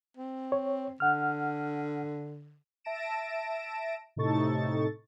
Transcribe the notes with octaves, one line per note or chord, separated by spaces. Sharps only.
C4
C#5
D3 F#5 F6
E5 A5 A#6 D7 E7
A2 C3 D#4 A4 C#6 A6